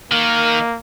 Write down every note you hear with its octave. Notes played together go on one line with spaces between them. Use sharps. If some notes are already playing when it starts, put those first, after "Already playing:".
D#3 A#3